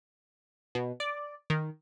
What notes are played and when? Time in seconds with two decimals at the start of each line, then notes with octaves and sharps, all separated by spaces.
0.75 B2
1.00 D5
1.50 D#3